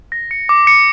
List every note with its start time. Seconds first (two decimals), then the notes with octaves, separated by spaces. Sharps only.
0.12 A#6
0.31 C#7
0.49 D6
0.67 C#7